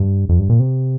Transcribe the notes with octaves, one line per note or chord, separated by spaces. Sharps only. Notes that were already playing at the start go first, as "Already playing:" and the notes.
Already playing: G2
F2
G2
A#2
C3